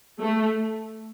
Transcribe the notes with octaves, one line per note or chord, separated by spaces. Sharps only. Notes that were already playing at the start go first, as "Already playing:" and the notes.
A3